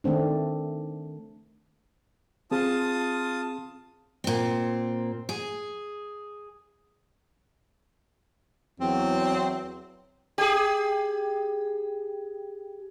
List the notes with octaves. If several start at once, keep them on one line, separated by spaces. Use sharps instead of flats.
D#3 A3 C4 D4
C4 F4 G#4 A5 D#6
A#2 C4
G#4
E2 F#3 C4
G4 G#4